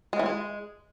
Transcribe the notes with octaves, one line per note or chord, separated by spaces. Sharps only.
G#3
E3
G#3